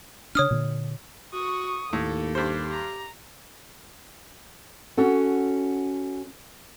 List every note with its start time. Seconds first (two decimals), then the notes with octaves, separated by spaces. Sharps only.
0.35 C#3 D4 C#5 D#6 F6
0.51 A#2 D3
1.33 F#4 C#6 D#6
1.93 D#2 A2 A#3 A4
2.35 G2 G4 C5
2.71 A#5
4.97 C#4 F#4 A4 F#5